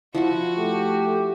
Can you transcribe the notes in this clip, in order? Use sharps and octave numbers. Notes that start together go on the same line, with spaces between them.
F3 E4 F#4 F#5
A3 G4